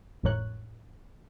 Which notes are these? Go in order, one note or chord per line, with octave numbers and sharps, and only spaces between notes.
G#1 F2 A2 A#4 C#5 F#6